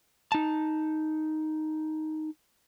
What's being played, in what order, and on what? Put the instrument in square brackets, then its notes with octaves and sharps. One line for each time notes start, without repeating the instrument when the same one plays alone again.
[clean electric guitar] D#4 A5